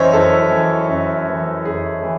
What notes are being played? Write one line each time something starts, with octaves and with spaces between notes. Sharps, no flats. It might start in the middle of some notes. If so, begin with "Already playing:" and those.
Already playing: F#2 E3 C5 C#5 D#5 E5
F#2 A4
E3
F#2
E3
F#2 G#4
E3